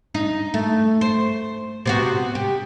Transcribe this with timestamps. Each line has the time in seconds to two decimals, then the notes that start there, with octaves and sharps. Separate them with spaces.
0.15 D#4
0.54 A3
1.01 C5
1.86 C3 B3 F#4
2.35 G4